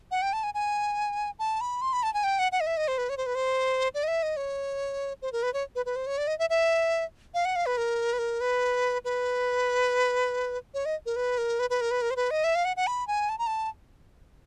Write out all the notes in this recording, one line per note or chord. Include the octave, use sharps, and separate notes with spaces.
F#5
G5
A5
G#5
G#5
A5
B5
C6
B5
A5
G#5
G5
F#5
F#5
D#5
E5
D#5
C5
B4
C#5
C5
B4
C5
D5
D#5
E5
D#5
C#5
C5
A#4
B4
C#5
B4
B4
C5
C#5
D5
D#5
E5
E5
F5
F#5
F5
B4
A#4
B4
A#4
B4
B4
C#5
D#5
A#4
B4
A#4
B4
B4
A#4
B4
A#4
C5
B4
D#5
E5
F5
F#5
F#5
B5
G#5
A5
A#5
A5